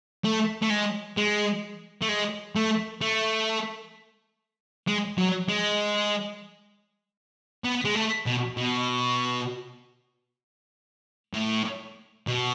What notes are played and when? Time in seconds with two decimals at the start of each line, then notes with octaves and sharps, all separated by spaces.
0.24 A3
0.62 A3
0.70 G#3
1.17 G#3
2.02 A3
2.09 G#3
2.56 A3
3.01 A3
4.87 G#3
5.18 F#3
5.49 G#3
7.64 B3
7.85 G#3
7.95 A3
8.26 B2
8.57 B2
11.34 A2
12.27 B2